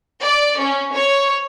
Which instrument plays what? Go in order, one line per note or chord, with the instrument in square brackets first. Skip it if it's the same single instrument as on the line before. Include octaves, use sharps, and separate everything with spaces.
[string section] D5
C#4
C#5